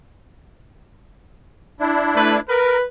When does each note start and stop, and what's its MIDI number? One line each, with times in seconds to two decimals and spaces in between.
1.80 2.40 62
1.80 2.40 64
2.14 2.35 57
2.14 2.35 71
2.48 2.78 70
2.48 2.83 71